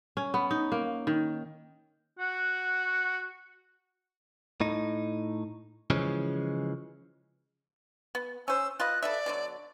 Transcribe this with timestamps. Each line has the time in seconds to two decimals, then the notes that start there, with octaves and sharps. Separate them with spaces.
0.17 C#4
0.34 B3
0.51 D#4
0.72 A#3
1.07 D#3
2.19 F#4 F#5
4.61 A2 D#4
5.90 C#3 E3 F3 G#3 C#4
8.15 B3
8.48 C#4 C5 E6
8.80 F4 B4 D#5 F#6
9.02 A4 B4 D5 E5
9.26 B2 D3 F#3